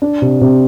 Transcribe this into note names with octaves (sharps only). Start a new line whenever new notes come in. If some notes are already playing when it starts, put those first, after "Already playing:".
D4
C3
C3